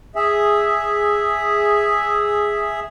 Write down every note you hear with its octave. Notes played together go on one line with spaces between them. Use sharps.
G#4 E5